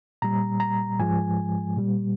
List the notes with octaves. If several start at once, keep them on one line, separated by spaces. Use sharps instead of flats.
A#2 G3 A#5
A#5
G#2 F3 G#3 G#5
A#2 G3